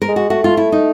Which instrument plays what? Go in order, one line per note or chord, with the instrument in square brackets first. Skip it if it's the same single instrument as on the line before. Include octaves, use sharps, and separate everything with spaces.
[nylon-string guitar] A#4
[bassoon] G#3
[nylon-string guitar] F#4
[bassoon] A3 [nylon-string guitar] F#4
[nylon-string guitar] F4
E4
D#4